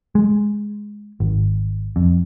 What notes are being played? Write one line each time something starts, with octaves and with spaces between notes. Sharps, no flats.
G#3
G#1
F2